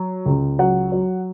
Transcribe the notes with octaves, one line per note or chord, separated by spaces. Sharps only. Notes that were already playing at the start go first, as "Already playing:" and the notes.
Already playing: F#3
C#2
F#3 F#5
F#3